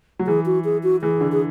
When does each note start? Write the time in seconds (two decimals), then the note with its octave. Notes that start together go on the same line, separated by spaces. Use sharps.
0.19 F#3
0.27 E3 G#4
0.46 F#4
0.65 G#4
0.83 F#4
1.02 E3 G#4
1.21 D3
1.32 G#4